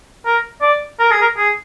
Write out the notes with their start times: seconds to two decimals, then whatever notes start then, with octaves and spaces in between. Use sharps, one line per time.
0.25 A#4
0.62 D5
1.00 A#4
1.11 G#4
1.21 A#4
1.37 G#4